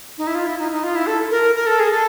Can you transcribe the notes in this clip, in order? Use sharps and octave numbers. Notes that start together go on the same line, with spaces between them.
D#4
E4
F4
E4
D#4
D#4
F4
E4
A4
A#4
A#4
A4
G#4
A4